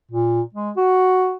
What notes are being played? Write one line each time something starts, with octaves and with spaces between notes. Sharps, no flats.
A#2
G#3
F#4